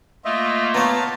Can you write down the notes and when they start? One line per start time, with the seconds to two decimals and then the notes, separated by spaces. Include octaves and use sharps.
0.25 A3 A#3 F4 D#5 E5
0.74 B3 C#5 F5 A5 A#5